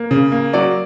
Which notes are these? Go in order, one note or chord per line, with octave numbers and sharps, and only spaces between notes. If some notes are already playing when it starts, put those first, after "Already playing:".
Already playing: A#3
C#3
A#3
F#3 D5